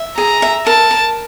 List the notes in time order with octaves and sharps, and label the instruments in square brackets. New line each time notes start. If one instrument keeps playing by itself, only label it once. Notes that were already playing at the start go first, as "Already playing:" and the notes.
Already playing: [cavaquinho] E5
[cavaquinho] G#4 [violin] A#5
[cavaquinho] E5
[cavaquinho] A#4 [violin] A5
[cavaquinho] A#4